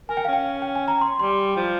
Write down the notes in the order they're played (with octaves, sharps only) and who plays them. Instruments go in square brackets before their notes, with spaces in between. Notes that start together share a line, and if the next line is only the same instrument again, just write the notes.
[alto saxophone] A#4 [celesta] G#5
[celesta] G5
F5
[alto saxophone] C#4
[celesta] G5
G5
G#5
A#5
C6
[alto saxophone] G3 [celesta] C6
[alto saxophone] F3